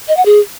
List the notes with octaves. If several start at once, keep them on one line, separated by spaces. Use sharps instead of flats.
D#5
F#5
G#4